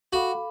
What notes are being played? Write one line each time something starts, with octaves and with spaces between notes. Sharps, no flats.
F#4 A4 F5 B5 D6